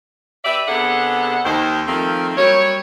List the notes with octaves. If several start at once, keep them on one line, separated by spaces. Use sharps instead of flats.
G4 B4 D5 E5
C3 B3 D4 G#4 A4 F#5
D#2 D#3 C5
D#3 F3 A3 A#3 C4
F#3 G3 A#3 C#5